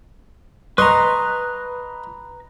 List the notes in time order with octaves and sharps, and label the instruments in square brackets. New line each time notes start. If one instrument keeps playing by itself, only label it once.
[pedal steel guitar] B4 A#5 [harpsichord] D#5 C6 C#6